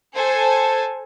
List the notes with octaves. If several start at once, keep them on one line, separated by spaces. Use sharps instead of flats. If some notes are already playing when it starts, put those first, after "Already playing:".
A4 C5 G#5